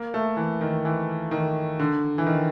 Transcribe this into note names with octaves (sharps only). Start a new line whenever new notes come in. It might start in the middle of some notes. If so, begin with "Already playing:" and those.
Already playing: A#3
A3
E3
D#3
E3
D#3
D3
E3
D#3